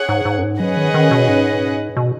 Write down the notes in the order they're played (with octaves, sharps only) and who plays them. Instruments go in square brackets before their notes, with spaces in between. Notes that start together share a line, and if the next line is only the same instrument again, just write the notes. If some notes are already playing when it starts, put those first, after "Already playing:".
Already playing: [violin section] G#4 C#5 F#5
[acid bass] G#2
G#2
F#2
G#2
[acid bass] F#3 [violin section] C#4 G#4 B4 D#5 F#5
[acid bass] D#3
D#3
B2
G#2
B2